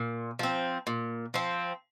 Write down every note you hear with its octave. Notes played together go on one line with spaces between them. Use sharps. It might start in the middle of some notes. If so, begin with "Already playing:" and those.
Already playing: A#2
F3 C4
A#2
F3 C4